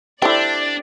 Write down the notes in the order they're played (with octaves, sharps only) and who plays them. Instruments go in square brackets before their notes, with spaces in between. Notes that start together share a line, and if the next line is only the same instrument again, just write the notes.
[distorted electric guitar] D4 [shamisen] E4 G5 [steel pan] G4 A4 C5 [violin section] D5